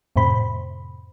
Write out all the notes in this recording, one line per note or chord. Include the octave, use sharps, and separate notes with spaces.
F2 A2 C3 C5 B5